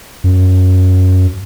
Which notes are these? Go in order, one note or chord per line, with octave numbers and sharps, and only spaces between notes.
F#2